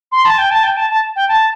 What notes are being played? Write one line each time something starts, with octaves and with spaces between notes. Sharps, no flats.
C6
A5
G5
A5
G5
A5
A5
G5
A5